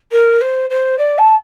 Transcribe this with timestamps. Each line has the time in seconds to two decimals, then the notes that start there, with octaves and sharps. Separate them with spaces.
0.11 A#4
0.41 C5
0.70 C5
0.98 D5
1.18 A5